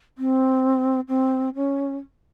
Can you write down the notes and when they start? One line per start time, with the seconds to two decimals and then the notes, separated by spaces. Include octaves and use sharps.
0.18 C4
1.09 C4
1.55 C#4